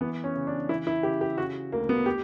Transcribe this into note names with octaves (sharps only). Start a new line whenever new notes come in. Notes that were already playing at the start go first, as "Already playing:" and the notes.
E3 B3
C#4
C#3
D4
E3 E4
E4
C#3 G4
G4
C#3 F#4
D2 A#3
B3
G4